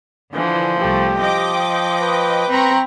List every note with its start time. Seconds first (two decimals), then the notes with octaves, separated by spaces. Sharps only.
0.35 D3 E3 F3
0.81 C2 A3 G4
1.19 F3 D#5 G5 D6
2.02 B4
2.50 C4 A#5 B5 C#6